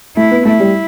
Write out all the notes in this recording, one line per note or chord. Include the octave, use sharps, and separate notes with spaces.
A3 E4
B3
A3 E4
G3